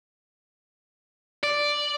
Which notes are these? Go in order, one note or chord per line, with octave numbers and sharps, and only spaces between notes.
D5